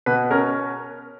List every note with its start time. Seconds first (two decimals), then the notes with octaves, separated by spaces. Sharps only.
0.06 B2 B4
0.31 C#4 A#4